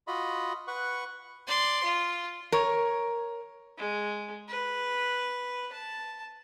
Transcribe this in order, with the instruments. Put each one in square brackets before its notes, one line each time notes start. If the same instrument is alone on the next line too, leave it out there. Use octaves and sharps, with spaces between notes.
[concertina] F4 F#4 D#5 B5
B4 F#5 C#6
[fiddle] D5 C6
F4
[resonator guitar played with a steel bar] A#4 C#5
[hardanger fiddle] G#3
B4
A5